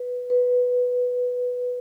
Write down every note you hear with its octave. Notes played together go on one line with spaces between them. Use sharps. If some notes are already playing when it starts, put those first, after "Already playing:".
Already playing: B4
B4